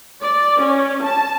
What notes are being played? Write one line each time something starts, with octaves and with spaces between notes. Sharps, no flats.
D5
C#4
A5